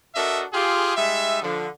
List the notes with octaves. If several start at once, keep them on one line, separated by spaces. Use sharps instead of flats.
D4 F#4 A4 A#4 D#5 E5
F4 G4 G#4
G3 G#3 D#4 E5
D3 F3